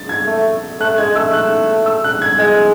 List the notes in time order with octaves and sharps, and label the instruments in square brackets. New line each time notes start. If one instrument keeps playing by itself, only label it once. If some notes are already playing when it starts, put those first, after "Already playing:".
Already playing: [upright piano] A6
G#6
[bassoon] A3
[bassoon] A3 [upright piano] F#6
[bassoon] G#3 [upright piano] G#6
[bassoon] A3 [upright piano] E6
[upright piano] F#6
E6
F#6
G#6
[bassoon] G#3 [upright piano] G#6